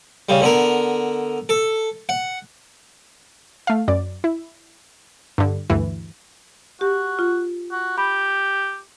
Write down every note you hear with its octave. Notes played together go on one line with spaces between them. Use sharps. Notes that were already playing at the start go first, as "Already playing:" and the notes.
C#3 G3
D3 B3 A#4
A4
F#5
A3 F5
F#2 D5
E4
G2 D3
D2 G2 E3
F#4 G4
F4
F#4
G4 B5